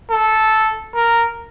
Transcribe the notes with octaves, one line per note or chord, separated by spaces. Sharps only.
A4
A#4